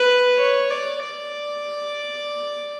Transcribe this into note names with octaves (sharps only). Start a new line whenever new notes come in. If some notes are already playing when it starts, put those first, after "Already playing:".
Already playing: B4
C#5
D5
D5